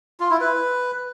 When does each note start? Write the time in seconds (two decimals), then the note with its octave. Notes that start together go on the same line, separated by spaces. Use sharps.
0.20 F4
0.30 E4
0.41 B4